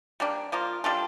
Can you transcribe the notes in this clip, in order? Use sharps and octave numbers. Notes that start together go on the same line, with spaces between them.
G3 A#3 D4
F3 A#3 F4
G3 D4 F4 A4